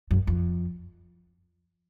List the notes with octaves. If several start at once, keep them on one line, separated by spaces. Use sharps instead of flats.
F#2
F2